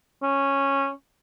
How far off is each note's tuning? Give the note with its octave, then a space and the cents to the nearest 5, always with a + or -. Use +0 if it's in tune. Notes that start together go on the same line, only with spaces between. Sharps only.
C#4 -10